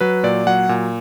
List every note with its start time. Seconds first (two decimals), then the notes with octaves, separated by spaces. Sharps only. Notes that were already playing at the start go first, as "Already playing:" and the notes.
0.01 F#3 B4
0.23 A#2 D5
0.47 F#3 F#5
0.69 A#2